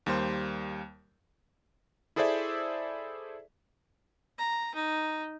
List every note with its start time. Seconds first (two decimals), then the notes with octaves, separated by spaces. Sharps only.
0.06 D#2 G3 A#3 C5
2.16 E4 G#4 A4 C5 D5 E5
4.38 A#5
4.75 D#4